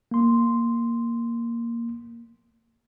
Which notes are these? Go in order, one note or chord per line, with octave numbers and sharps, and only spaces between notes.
A#3 C6